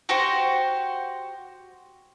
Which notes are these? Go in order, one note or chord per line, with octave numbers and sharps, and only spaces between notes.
F#4 G4 C5 F#5